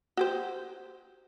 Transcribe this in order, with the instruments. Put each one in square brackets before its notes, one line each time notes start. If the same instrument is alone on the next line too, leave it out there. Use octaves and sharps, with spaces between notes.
[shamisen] F#4 G4 C5